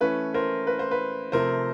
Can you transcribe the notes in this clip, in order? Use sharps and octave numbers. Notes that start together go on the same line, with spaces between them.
E3 A3 C#4 B4
A#4 C5
B4
C5
B4
C3 F3 A3 A#4 C5